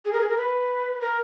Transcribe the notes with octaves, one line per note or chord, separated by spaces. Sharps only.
G#4
A#4
G#4
A#4
B4
A#4